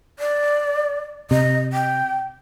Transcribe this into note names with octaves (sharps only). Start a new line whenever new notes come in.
D5
C3 D#5
G5